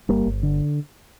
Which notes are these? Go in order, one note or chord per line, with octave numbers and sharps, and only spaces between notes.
G1 G3 A#3
G1
D3